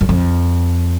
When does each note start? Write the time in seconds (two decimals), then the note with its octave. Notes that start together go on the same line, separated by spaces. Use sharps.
0.01 F#2
0.09 F2